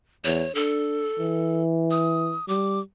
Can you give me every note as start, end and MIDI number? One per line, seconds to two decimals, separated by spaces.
0.25 0.46 40
0.25 0.54 73
0.55 1.07 62
0.55 1.61 69
1.19 2.36 52
1.91 2.46 87
2.48 2.80 55
2.48 2.80 86